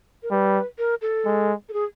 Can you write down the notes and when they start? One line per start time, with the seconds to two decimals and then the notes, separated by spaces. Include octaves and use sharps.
0.23 A#4
0.31 G3 B4
0.78 A#4
1.02 A4
1.25 G#3
1.69 A4
1.73 G#4